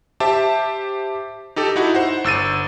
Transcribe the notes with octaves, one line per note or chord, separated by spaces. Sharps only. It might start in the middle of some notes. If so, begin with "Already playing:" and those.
G4 C5 E5 A5
D#4 G4 A4
D#4 E4 F#4
C5 F#5
G1 E6 A6 D#7